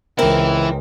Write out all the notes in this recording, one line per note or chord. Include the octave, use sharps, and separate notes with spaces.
C#2 E3 C4 E4 A#4